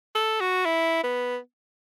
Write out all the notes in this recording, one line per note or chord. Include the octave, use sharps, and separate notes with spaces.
A4
F#4
E4
B3